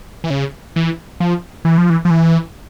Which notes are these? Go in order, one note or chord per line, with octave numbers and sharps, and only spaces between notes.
E3
C#3
E3
F3
E3
F3
E3
F3
E3